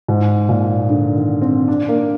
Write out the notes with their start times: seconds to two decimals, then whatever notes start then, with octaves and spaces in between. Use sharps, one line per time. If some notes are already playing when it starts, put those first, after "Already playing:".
0.08 G#2
0.49 A#2
0.89 D3
1.15 D#3
1.42 C4
1.68 D4
1.88 A#3